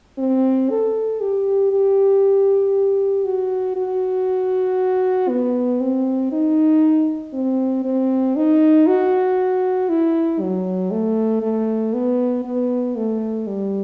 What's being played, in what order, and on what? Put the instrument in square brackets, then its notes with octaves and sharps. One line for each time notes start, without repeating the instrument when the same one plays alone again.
[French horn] C4
A4
G4
G4
F#4
F#4
B3
C4
D#4
C4
C4
D#4
F#4
E4
F#3
A3
A3
B3
B3
A3
G3